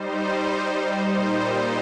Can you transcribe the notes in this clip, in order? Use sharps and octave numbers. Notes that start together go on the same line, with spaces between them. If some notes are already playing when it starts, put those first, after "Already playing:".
Already playing: G3 D#4 C5
A#2 G3 D#4 C5